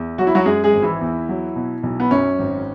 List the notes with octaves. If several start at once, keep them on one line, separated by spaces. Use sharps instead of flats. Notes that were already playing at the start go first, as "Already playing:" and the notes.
Already playing: E2
F#3 F#4
E4
F#3 F#4
F#2 G#3 G#4
G#3 G#4
G#1
E3 E4
E2
F#3
B2
B1
B3
F#2 C#4
G#1